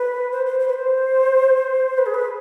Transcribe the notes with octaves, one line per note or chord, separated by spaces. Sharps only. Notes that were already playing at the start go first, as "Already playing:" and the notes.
Already playing: B4
C5
C5
C5
B4
C5
B4
G#4
B4